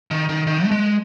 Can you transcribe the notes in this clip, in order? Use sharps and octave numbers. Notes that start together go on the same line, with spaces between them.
D#3
D#3
D#3
A3
G#3